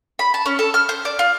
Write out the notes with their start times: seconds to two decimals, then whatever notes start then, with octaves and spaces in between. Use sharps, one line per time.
0.19 B5
0.34 A5
0.46 C#4
0.59 A4
0.74 F6
0.89 C5
1.05 D5
1.19 F4